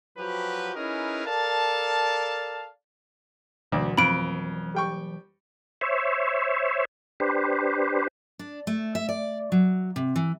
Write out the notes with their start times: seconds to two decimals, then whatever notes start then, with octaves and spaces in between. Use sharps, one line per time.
0.18 F3 F#3 F#4 G4 B4
0.75 C#4 D#4 E4 G#4 A#4 B4
1.26 A4 A#4 D5 F5 A5
3.72 D2 B2 E3 F#3 D5
3.98 F2 B5 D7
4.75 G3 G5 C#6
5.81 C5 C#5 E5
7.20 D4 G4 B4 C5
8.39 D4
8.67 A3
8.95 E5
9.09 D5
9.52 F#3
9.96 C3
10.16 E3